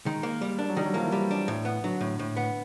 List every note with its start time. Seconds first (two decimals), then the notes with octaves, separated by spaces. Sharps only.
0.06 D#3 G#3
0.23 A#3
0.41 G3
0.59 D4
0.69 F#3
0.77 D#3 G3
0.86 F#3
0.94 F3 A#3
1.04 E3
1.12 G3
1.31 D4
1.48 A2
1.65 B3
1.84 D3 F#3
2.00 A2
2.19 A2
2.37 B3